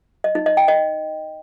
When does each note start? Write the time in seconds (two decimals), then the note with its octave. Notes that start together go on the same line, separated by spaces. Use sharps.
0.24 D#5
0.35 D#4
0.46 D#5
0.57 G5
0.68 D#5